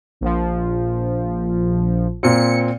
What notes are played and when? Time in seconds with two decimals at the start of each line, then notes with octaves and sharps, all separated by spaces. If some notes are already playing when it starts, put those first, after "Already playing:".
0.21 A#1 F3
2.23 A#2 C4 C#7